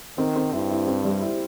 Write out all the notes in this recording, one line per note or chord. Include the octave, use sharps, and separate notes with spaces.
D#3 C4
C4
G2 E4
E4
C4
G3
E4